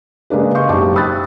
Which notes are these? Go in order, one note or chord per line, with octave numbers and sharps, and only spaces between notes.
C#3 G#3 A#3 D4 B4
D#5 F5 C6 C#6 G6
F#1 B1 G3 A5 C#6 D6
G5 B5 D#6 E6 F#6 A6